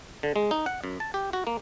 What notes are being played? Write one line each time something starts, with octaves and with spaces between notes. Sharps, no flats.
D3
G#3
D#4
F#5
F#2
A5
G4
F#4
A#3